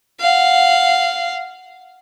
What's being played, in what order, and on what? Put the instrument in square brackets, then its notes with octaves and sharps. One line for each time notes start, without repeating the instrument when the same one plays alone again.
[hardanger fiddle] F5 F#5